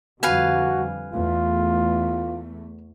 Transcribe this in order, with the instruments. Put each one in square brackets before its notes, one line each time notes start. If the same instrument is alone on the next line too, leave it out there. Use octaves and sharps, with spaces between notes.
[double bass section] F2 D3 G3 [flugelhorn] F#4 [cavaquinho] B4 F5 G#5
[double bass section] E2 A3 [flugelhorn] F4